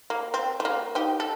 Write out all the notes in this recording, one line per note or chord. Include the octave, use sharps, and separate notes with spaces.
A#3
C4
A3
A#3
D#4 G4
A4